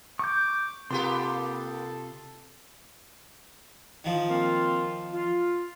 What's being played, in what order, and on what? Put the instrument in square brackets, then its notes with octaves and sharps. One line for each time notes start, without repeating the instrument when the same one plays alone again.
[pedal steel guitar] C#6 G6 [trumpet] D6
[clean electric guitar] C3 F4 [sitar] A#3 B3 G4 [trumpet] A4 [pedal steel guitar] C6
[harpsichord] D#3 F3
[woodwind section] A#3 C4 F4
F4